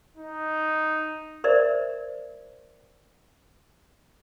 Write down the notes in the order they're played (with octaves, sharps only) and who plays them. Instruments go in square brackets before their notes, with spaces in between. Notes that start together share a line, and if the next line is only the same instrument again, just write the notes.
[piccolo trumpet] D#4
[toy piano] A#4 C5 D5 E5